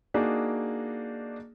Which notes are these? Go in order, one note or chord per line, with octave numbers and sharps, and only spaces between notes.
A#3 D4 D#4 F#4 G#4